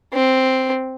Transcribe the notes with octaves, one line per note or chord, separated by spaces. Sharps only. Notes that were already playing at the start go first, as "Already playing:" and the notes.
C4